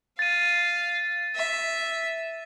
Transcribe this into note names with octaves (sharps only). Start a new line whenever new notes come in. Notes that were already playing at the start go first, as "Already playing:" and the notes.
F5 A6 D#7
E5